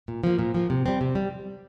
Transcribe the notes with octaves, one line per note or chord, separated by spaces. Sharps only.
A#2
F3 A#3
A#2
F3 A#3
C3
G3 C4
C3
G3